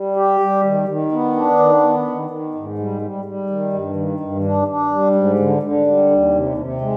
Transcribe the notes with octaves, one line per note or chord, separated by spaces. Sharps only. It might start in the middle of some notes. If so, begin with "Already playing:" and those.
Already playing: G3
G4
G3
D#3
D#3
B3
D4
D#3
B3
D#3
D#3
G#2
G3
G3
G3
D#3
G2
D#3
G2
D4
D4
G3
G#2
D3
D3
G3
D#2
C3
C3
G#3